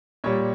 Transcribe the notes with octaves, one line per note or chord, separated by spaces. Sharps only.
A#2 G3 C#5